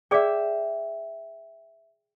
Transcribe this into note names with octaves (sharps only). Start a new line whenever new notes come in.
G#4 D5 E5 G5 D6